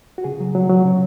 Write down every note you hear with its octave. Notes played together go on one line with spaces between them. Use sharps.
F#4
C#3 G#4
F#3
F#3
F#3
C#3